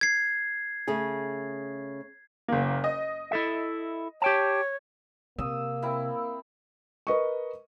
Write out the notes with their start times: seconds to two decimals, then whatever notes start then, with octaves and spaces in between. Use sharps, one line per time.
0.01 G#6 C7
0.87 C#3 A3 G#4
2.48 F#1 A#3
2.84 D#5
3.31 E4 A4 E5
4.22 G4 C#5 G5 A5
5.39 C3 A#3 D#6 E6
5.82 C4 E4 A#4
7.07 A#4 B4 D#5 C#6